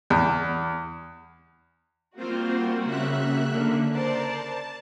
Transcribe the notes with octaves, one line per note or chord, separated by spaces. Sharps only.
E2
G3 A#3 C4 F4 F#4 C5
C#3 E5 F#6
D3 A#3
A#4 C5 D5 A5